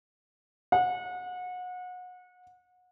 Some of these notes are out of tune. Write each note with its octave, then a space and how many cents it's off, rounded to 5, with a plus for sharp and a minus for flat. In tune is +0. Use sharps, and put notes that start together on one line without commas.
F#5 -30